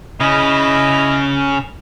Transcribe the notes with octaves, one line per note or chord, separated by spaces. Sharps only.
C#3 C#4 E4 D#5